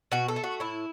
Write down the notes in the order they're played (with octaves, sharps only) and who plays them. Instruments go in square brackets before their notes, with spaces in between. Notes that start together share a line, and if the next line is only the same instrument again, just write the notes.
[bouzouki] B2 F#4
A4
A3
F#4
A2 E4